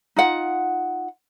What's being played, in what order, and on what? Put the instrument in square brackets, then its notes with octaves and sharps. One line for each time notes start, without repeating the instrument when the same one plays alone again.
[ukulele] D#4 F4 F#5